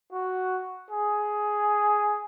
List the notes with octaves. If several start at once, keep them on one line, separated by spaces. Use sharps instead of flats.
F#4
G#4